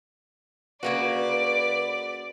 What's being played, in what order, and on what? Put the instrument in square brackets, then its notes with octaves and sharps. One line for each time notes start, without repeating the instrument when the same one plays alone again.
[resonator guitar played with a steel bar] C#3 A#3 F#4 [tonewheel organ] B4 [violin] D5